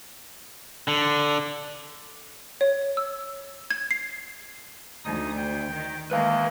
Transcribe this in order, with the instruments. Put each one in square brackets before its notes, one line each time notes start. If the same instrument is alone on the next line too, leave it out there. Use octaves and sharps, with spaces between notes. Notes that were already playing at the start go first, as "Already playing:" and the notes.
[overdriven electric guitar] D3
[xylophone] C#5
E6
G#6
C7
[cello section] D2 [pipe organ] D#4 D#6
[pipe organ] G5
[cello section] D#3
[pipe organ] D#3 E3 [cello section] G#3 A#3 [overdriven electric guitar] B4 F5